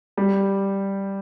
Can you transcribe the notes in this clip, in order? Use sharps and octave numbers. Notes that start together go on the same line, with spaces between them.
G3